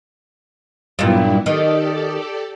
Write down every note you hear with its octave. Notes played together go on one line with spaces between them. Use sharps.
G2 A#2 F#3 B3 E4
D#3 G4 A4 D5